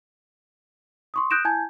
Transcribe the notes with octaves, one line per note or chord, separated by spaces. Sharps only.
C6 C#6 D#6
D#6 F#6 G6 A#6 D7 E7
E4 G#5 A5 G6 G#6